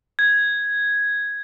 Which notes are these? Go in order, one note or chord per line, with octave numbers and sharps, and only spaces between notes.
G#6